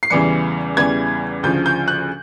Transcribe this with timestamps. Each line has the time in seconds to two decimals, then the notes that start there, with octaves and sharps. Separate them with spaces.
0.03 C7
0.10 E2 C#3 E3 G3 C#7
0.77 E2 C#3 E3 G3 G#6
1.43 D2 C#3 F3 G6
1.66 G6
1.88 F#6